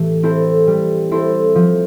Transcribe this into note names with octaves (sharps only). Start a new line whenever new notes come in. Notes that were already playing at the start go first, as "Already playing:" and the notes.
Already playing: A2 E3 A3 G4
C4 E4 A4 C5
G3
C4 E4 A4 C5
F3